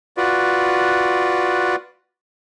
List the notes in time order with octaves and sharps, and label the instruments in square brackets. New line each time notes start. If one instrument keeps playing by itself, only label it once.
[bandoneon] F4 F#4 B4 D5